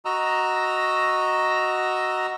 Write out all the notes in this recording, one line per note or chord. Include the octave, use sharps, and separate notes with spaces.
F#4 D#5 A#5 E6